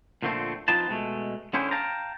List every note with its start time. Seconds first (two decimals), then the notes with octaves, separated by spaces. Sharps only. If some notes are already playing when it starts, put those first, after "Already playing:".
0.22 A#2 D3 F3 A3 C4
0.68 F3 C4 D#4 F4 B4 A5
0.90 B2 G#3 A3
1.54 D3 C#4 E4 G#4 C5 G5
1.71 F5 G5 A5 A#5